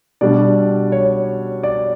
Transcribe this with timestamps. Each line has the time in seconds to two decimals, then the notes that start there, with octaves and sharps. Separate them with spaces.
0.21 B2 G3 D4 D5
0.92 C#5
1.63 D5